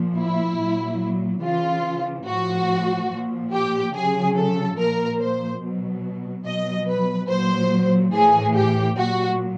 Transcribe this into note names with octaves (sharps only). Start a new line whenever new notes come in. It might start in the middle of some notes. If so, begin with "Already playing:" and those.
Already playing: A#2 F3
E4
A#2 F#3
C#3 E3 F4
A2 F3 F#4
A#2 F3
G4
C#3 F#3 G#4
A4
A#2 F3 A#4
C5
B2 F#3
B2 F#3 D#5
B4
A#2 F#3 C5
A2 E3 G#4
G4
A#2 F#3 F#4